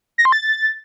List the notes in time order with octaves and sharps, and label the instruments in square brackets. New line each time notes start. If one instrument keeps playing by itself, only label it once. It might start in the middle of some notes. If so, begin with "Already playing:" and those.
[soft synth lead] A#6
C6
A6